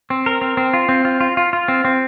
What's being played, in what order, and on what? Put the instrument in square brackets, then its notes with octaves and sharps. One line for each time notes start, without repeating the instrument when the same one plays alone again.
[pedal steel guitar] C4
A#4
C4
C4
F4
C4
F4
F4
F4
F4
C4
C4